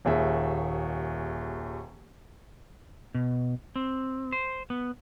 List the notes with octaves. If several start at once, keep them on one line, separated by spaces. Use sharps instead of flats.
D#1 D#2 G#4 E5
B2
C4
C5
B3